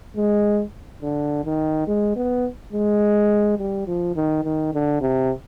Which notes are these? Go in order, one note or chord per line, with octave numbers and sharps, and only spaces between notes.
G#3
D3
D#3
G#3
B3
G#3
G3
F3
D#3
D#3
D3
C3